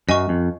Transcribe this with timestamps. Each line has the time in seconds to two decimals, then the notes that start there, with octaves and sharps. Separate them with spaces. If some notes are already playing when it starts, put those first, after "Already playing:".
0.09 F#2 D#5 G#5 C#6
0.29 F2